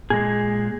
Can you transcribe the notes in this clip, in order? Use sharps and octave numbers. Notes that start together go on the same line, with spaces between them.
A#2 G#3 G#4